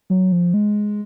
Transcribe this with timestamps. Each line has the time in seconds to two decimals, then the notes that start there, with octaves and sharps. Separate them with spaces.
0.10 F#3
0.32 F3
0.54 G#3